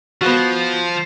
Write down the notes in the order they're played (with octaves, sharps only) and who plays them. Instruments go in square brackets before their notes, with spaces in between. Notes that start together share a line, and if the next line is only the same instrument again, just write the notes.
[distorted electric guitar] F3 [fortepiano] B3 F#4